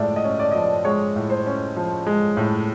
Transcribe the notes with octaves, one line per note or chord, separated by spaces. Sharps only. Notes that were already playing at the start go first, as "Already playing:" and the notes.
Already playing: A2 F3 G#3 D5 E5
D#5
C#4
D5
F3 D#5
D5
G#3 C#5
A2
C5
C#4
F3
G#3
A2